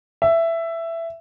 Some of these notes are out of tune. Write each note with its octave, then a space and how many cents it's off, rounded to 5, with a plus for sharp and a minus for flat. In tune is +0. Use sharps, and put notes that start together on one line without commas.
E5 +10